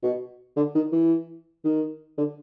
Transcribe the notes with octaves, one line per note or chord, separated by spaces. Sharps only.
B2
D3
D#3
E3
D#3
D3